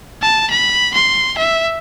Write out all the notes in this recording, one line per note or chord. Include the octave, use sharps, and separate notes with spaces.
A5
B5
C6
E5